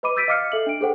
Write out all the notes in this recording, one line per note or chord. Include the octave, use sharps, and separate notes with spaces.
B4 D#5 B5 D6 D#7
E6 G6 A6 B6 D7 D#7
D#5 F5 D6 F6 C7 C#7
A4 E5 F#7
D4 D7
G#4 A4 C5 F#5 G5